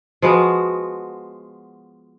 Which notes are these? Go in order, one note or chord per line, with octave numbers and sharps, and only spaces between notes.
F3 G#3 B3 F#4